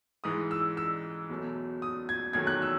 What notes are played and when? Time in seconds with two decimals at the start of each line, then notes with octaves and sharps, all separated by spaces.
0.24 G#2 E3 G#3 D#6
0.51 E6
0.77 E6
1.29 E2 B2 F#3 A3
1.82 D#6
2.09 G#6
2.33 E2 D#3 F#3 A3 G#6
2.47 F#6
2.62 E6